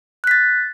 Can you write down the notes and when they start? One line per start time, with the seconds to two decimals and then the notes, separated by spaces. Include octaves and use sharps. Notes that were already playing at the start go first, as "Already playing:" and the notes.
0.24 F#6
0.27 B6
0.31 A6